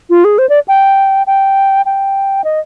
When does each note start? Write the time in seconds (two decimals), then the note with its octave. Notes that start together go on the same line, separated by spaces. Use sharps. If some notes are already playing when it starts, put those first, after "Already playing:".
0.10 F4
0.24 G#4
0.38 C5
0.49 D5
0.68 G5
1.27 G5
1.86 G5
2.44 D#5